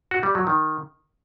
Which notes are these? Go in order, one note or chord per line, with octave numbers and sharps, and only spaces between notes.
F#4
G3
F#3
D#3